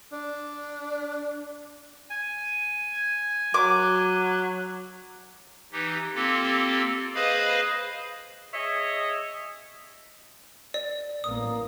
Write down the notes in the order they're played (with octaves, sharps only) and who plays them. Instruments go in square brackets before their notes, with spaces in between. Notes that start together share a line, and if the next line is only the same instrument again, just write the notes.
[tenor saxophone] D4
[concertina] G#5
[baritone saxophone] F#3 [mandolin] D6
[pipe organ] E3 D#4 G4
A#3 C4 F4 G4 A4
G#4 B4 C5 D#5 F5 B5
[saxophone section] G#4 C#5 D#5 E5
[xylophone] D5
[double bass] A1 A#3 [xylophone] D#6